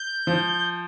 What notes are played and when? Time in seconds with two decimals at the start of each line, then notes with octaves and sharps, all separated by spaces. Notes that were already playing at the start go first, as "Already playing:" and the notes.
Already playing: G6
0.27 F3